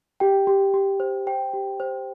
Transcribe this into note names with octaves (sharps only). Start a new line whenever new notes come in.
G4 G5
G4
G4
C5
C5 G5
G4
C5